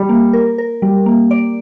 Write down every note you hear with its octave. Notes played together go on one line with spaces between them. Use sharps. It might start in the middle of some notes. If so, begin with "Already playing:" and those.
Already playing: G3
A#3
A#4
A#4
G3 G4
A#3
D5